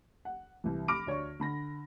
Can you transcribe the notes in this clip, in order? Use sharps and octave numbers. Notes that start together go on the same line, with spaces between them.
F#5
C2 E3
B5 D6 F6 A#6 D7
D2 C#5 D5 C#6
D3 B5 A#6